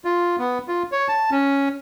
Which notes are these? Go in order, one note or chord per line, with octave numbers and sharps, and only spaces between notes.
F4
B3
F4
C#5
A5
C#4